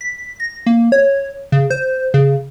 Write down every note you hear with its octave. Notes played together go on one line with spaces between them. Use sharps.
B6
A#6
A#3
C#5
C#3
C5
C#3